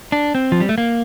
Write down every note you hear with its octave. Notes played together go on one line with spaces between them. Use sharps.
D4
C4
F3
G3
A3
A#3